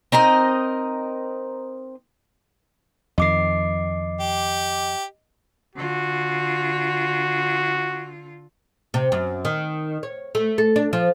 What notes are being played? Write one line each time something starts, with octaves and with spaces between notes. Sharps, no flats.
C4 D#4 A#4 D#5
F2 D#3 D#5 D6 C7
G4
D3 F4 F#4
C3
F#2
D#3
C#5
A3
A4
D4
F3